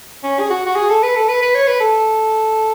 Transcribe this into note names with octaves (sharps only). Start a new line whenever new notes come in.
C#4
G#4
F#4
F#4
G#4
A4
B4
A4
B4
B4
C#5
B4
A4